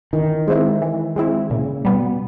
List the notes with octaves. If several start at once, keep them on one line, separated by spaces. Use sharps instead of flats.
D#3 E3
G#3 C4 E4
E3
G#3 C4 E4
A#2 C#3
B2 G3 B3